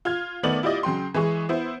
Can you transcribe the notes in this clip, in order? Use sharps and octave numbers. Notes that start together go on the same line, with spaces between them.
F4 F6 G#6
D#3 A3 B3 D5 F#7
E4 F4 G4 D5 D#5
C#3 F#3 G5 C6
E3 G#3 G#4 C#6
B3 E4 C5